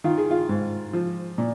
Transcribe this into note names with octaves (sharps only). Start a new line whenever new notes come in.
D#3 F4
G#4
F4
G#2
F3
A#2